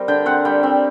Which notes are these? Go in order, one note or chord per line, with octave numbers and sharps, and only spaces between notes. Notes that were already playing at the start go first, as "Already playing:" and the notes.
Already playing: G3 C4 A#4 C5
D3 G5
C4 F#5
G3 G5
C4